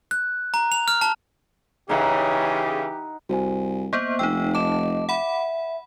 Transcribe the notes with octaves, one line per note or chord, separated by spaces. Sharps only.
F#6
A#5
F7
F6
A5
C#3 E3 D#4 G4 F#5
C2 F#4 C5 G#5
A#3 B3 C5 G6
F1 D#4 G5 E6
D#5 A5 D6 E7
E5 F#5 B5